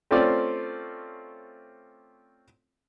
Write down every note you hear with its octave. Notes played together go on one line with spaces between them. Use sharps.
A3 C4 C#4 F4 C5 D5